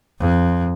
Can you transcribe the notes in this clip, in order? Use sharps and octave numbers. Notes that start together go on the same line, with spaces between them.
F2